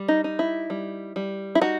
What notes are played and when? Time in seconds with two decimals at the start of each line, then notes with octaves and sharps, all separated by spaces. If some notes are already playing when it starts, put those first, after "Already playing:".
Already playing: G3
0.08 D#4
0.24 D#4
0.39 E4
0.70 G3
1.16 G3
1.55 E4
1.61 D#4 F#4